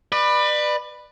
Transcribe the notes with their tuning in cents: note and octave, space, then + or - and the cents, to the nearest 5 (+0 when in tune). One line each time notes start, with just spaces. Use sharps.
B4 +0 D5 +30